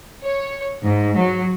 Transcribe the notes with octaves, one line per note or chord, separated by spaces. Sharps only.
C#5
G#2
F#3